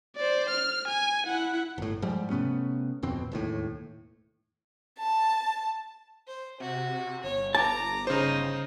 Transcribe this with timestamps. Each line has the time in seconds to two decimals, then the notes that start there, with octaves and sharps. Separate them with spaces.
0.17 C5 D5
0.50 F6
0.88 G#5
1.26 E4 F#5
1.78 G1 A2
2.02 G#2 F3 G3
2.30 C3 A3 B3 C#4
3.03 D1 F2 B2 C4
3.32 E1 D#2 A2
4.99 A5
6.27 C5
6.60 C3 F#4
7.23 G1 C#5
7.55 A5 A#5 D6
8.07 C#3 D#4 C5